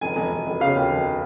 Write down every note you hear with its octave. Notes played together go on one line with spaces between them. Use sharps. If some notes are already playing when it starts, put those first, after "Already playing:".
F1 G#5
F1
F1
F1
C#3 F5
D#2
F1